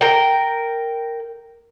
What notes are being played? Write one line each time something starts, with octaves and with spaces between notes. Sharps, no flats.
A#4 G5